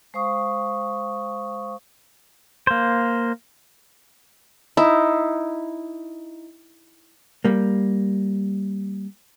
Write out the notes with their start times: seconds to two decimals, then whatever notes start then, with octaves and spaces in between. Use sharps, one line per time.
0.14 G#3 C5 F5 C#6 D#6
2.67 A#3 C5
4.77 D#4 E4
7.45 G3 A#3